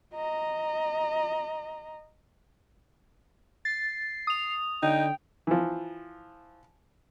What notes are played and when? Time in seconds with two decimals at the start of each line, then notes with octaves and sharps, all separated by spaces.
0.14 D#5 A#5
3.65 A6 C7
4.27 D#6 F7
4.82 D3 D#4 G5
5.47 E3 F3